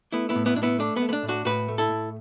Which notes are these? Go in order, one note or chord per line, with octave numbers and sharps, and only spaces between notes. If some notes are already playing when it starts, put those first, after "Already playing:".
A3 B3 E4
B3 E4
A2
B3 E4
A2 D4
B3 E4
A3 D4
B3
A3
B3
D4
A2
D4 F#4
A2 F#4 B4
A3
E4 A4
A2